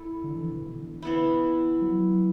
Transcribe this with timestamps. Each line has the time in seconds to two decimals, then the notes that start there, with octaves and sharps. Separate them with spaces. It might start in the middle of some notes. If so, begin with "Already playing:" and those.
Already playing: A3 E4
0.24 D3
0.36 E3
0.43 D3
0.50 B2
0.76 D3
1.02 E3 B3 E4
1.82 F#3